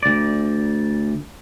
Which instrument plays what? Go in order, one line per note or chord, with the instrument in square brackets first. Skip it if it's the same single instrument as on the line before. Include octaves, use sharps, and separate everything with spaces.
[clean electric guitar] D2 D5